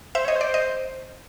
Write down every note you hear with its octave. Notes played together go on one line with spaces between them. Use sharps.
C5 E5
C#5 D#5
C5
D5
D#5